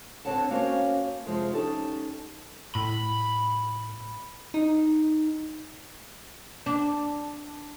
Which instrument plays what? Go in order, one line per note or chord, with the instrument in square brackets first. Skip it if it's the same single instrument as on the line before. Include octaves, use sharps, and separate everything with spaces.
[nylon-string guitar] D3 C4 A4 C#5 F#5 A5
A#3 C#4 F#4 C5 C#5 F5
F2 C3 F3 G#3
C#4 D#4 G4 A4
[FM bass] A2 [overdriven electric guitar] B5
[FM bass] D#4
[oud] D4